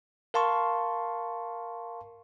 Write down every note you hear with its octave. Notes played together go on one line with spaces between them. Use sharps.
A#4 F5 A5 C6 C#6